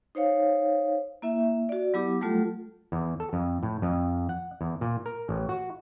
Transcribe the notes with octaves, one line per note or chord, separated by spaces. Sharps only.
D#4 C5 C#5 F5
A#3 E4 E5
F#4 D5
F#3 B3 E4 G4 D6
F#3 G3 A3 F4 A4
E2
A4
F2
A2
F2
F#5
E2
A#2
A#4
A1
F#4